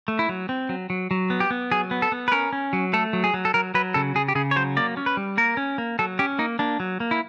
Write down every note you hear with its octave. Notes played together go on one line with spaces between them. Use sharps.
A3
E4
F#3
C4
F#3
F#3
F#3
B3
G4
B3
F#3 G#4
B3
A4
B3
B4
C#4 A#4
C#4
F#3
A3 A4
F#3
G#4
F#3
A4
F#3 A#4
F#3 B4
C#3 A4
C#3 G#4
G4
C#3 G#4
C#5
F#3 C5
A#3 D5
C#4
B4
G3
A#3 A#4
C#4
A#3
F#3 A4
C#4 G4
A#3 D#4
A#3 D4
F#3
A#3
E4